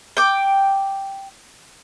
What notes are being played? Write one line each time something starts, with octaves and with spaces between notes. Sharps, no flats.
G5 D6